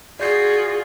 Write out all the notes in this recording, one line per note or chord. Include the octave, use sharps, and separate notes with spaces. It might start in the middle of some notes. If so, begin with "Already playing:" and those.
F4 F#4 G#4 D5 G6 C7